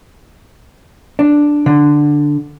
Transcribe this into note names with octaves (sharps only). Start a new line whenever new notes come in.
D4
D3